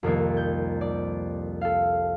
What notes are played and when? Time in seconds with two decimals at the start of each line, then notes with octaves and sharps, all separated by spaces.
0.03 C2 F2 D#3 A#3
0.37 G6
0.81 D5
1.61 A4 F5